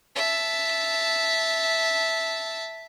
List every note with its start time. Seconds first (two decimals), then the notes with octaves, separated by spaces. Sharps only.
0.16 E5 A5